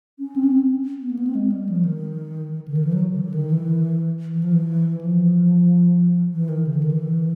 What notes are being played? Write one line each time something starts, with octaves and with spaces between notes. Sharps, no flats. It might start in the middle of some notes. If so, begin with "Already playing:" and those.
C#4
C4
C#4
C4
B3
A#3
B3
C4
G#3
G3
F3
D#3
D3
D#3
E3
F#3
D3
D3
D#3
E3
E3
F3
E3
F3
E3
D#3
C#3
D3
D#3
E3